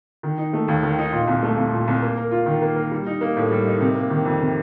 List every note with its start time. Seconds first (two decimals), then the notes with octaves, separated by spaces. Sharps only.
0.23 D#3
0.38 D#4
0.53 A3
0.68 D#2
0.83 D#3
0.98 D#4
1.13 A#2
1.27 C2
1.43 A3
1.57 C2
1.72 A#2
1.87 C2
2.02 A#3
2.17 A#4
2.31 F4
2.46 D#3
2.62 A#3
2.76 A#4
2.91 G3
3.07 D#4
3.21 A#3
3.37 A2
3.51 G3
3.66 D#4
3.81 C3
3.95 A#3
4.10 D#3
4.25 F2
4.40 C3